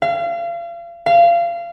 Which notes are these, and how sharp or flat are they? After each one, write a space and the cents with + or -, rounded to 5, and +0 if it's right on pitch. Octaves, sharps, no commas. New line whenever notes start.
F5 -35
F5 -25